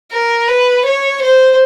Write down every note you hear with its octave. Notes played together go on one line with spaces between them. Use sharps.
A#4
B4
C#5
C5